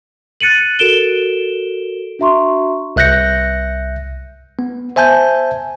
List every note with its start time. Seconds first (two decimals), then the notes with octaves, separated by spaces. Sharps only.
0.41 F#6 A6 C#7 D#7 F#7
0.79 F#4 A4 A#4 D7 E7 G7
2.19 D4 F#4 E5 A#5 C6 C#6
2.96 C2 E5 F#6 G6 A#6 C#7
4.59 B3
4.96 C5 E5 G#5 A5 G6